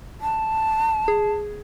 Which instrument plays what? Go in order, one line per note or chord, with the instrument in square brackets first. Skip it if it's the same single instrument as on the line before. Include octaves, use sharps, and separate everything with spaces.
[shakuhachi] A5
[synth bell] G#4